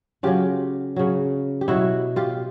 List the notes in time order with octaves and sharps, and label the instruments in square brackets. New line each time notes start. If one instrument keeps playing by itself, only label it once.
[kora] C#3 F#3 F4 G4
C#3 F#3
G4
B2 F#3 E4 F#4
F4 G4